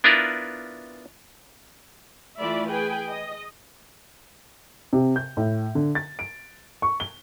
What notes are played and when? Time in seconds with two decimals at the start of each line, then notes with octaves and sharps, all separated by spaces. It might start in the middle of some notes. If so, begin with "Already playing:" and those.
0.04 B3 D4 E4 F4 A#4 B4
2.39 E3 A3 F4 D5 E5 B5
2.70 G#4 B4 G5 G#5
3.09 D#5
4.93 C3
5.16 G6
5.37 A2
5.75 D3
5.95 A6
6.19 D7
6.82 C#6
7.00 G7